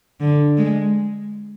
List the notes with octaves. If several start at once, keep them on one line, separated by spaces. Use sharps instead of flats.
D3
G#3